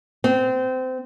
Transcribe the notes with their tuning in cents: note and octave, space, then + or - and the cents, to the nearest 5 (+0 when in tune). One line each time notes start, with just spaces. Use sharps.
C4 -25